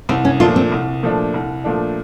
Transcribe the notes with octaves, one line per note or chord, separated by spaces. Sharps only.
C2 C4
C#4
A#2 F3 A3 D4 F4
C4
C2
A#2 F3 A3 D4
C2
A#2 F3 A3 D4